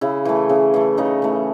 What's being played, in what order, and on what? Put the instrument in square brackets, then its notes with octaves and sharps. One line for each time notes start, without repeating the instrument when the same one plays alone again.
[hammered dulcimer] C#3 E4
E3 A3
C#3
E3 A3
C#3 D#4
E3 A3